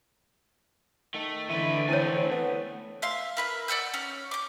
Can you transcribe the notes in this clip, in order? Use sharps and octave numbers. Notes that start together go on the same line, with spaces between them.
D#3 A3 A4
D3 E3 A3 E4 B4
A3 C4 E4 C#5 G#5
B3
E5 F5 C6
A#4 B4 E5
D5 F#5 E6 G6
C#4
D6 G6